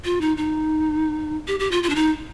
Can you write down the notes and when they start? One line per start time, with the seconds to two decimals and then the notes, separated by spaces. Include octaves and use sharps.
0.05 F4
0.21 D#4
0.37 D#4
1.48 G4
1.60 G4
1.71 F4
1.83 F4
1.90 D4
1.95 D#4